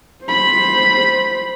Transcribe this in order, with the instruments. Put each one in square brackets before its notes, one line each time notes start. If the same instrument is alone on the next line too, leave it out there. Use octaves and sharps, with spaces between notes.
[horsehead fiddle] C5 B5